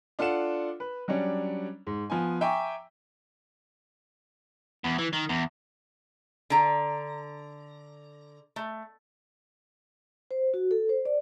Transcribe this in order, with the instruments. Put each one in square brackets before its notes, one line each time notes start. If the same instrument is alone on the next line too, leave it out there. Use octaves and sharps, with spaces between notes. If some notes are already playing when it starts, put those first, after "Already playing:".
[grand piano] D4 F4 A4 F#5 E7
B4
F#3 G3 C#4 D4
G#2
F3 B3 G#5
E5 G5 G#5 A#5 C#6 D6
[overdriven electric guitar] E2
E3
D#3
E2
[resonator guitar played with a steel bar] D3 A#5
A3
[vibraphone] C5
F#4
A4
C5
D5